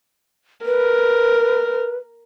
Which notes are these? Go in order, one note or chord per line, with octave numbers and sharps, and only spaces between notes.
A#4 B4